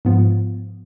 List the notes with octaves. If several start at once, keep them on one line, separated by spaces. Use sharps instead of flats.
G#2 F3 B3 F4